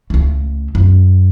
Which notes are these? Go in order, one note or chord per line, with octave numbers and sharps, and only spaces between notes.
C#2 A3
F#2